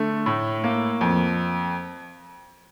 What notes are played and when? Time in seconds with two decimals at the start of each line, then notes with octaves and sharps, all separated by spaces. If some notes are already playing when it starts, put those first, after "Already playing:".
Already playing: D3 A3
0.26 A2
0.64 A#3
1.01 F2